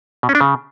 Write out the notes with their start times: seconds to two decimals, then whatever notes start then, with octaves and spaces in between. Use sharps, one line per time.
0.23 B2
0.29 C#4
0.35 D4
0.41 C#3